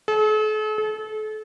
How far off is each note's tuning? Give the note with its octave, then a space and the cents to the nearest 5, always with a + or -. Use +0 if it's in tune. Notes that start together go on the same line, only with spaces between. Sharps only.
A4 -45
A4 -35